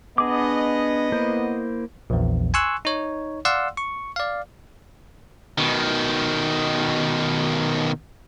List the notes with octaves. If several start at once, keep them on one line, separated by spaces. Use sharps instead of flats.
B3 D4 G#4 D#5 D6
A#3 E4 C5
A#1 E2
G#5 C6 C#6 E6 F#6
D#4 C#5
D5 F5 F#5 C6 E6
C#6
D5 F5
B2 D#3